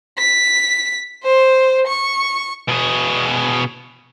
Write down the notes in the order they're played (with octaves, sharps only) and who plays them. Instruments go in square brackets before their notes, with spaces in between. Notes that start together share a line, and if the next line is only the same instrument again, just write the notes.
[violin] B6
C5
C#6
[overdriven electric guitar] B2 G#4